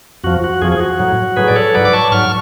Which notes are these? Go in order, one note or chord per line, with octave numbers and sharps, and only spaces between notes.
F2 F3 F#4
F#4
F2 F3 G#4
G#4
F#4
A2 F#3
A2 F#3 G#4 B4
D5
A4 C#5
G#2 F#3 B4 D5
D6
A5 C#6
G#2 F#3 C#6 F6